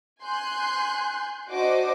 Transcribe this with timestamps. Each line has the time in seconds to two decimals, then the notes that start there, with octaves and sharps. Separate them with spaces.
0.22 G#5 C6 F#6 G6
1.50 D4 F#4 C5 D#5 D6